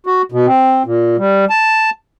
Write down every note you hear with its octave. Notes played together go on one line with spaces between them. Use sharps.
F#4
B2
C4
A#2
G3
A5